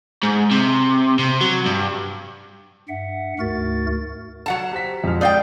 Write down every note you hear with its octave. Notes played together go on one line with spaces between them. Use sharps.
G#2
C3
C3
F#3
G2
G2 E5 F#5
D2 G#2 A3 F#4 A#4 A6
F#3 F#5 A5
G4 C5 B6
F2 G#3 F6
D5 F5 G5 D#6 G6 A6